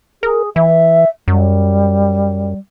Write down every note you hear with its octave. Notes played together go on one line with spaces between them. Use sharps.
G#4 A#4
E3 E5
F#2 G3